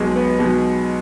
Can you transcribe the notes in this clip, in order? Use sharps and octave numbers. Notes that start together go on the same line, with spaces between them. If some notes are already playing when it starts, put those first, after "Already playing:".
Already playing: B1 B2 G#3
B3
B1 B2 G#3